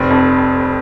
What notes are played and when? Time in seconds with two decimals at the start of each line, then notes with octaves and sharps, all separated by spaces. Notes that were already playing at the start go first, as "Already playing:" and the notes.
Already playing: F1 C4
0.10 F2